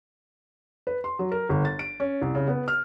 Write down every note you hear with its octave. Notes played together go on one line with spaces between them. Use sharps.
B4
C6
F#3
A#4
G1
A6
D7
C#4
C2
C#3
B3
F6